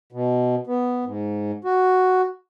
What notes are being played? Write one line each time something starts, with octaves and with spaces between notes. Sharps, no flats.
B2
B3
G#2
F#4